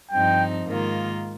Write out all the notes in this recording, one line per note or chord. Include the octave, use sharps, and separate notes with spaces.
G2 F3 C4 D#4 G5
G#2 D#3 A#3 F4